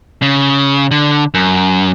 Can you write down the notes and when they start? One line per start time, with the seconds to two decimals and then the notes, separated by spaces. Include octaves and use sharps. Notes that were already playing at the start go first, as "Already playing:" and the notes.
0.22 C#3
0.91 D3
1.34 F#2